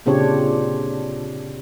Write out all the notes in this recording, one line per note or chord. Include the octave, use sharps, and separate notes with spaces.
A#2 C#3 C4 D4 G4 C#5